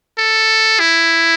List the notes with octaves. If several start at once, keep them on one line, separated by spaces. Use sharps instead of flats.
A4
E4